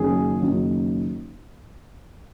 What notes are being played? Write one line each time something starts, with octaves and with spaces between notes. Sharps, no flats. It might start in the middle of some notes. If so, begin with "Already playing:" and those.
Already playing: F#1 F#2 D#3 F#3 G#4
F#1 F#2 D#3 F#3